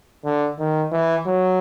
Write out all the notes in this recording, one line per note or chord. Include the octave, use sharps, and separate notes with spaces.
D3
D#3
E3
F#3